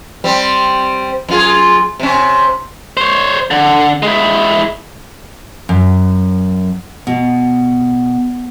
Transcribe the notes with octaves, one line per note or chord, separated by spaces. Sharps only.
G3 C4
F#2 F4 G#4
C3 C#4
C5 C#5
D3
G#3 E4
F#2
B2